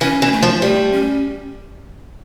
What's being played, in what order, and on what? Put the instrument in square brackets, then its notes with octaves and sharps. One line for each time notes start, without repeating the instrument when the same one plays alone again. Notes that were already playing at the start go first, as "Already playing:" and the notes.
[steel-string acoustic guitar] E3 [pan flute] C#4
[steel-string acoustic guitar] E3
[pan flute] A#3
A3
[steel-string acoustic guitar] F3
[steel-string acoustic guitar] G3 [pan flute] A3
[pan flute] C#4